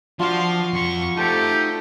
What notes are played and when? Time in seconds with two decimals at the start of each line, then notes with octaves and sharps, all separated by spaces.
0.19 F3 D4 F4 F#4 F5 C6
0.73 F2 C6 C#6
1.17 A3 C4 D#4 G4 A4